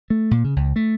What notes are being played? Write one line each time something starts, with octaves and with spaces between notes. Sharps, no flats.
A3
A#2
C#3
C#2
A3